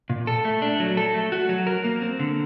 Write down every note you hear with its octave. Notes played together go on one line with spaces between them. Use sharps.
A#2
A4
A3
D4
F#3
A4
A3
F#4
F#3
A#4
A#3
C4
D3